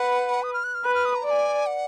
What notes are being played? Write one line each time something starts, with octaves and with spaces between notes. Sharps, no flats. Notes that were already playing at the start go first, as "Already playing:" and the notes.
Already playing: B4 F#5
D#6
F6
F#6
F6
B4 F#6
F6
D#6
A#5
D5 A#5
G#5
F#5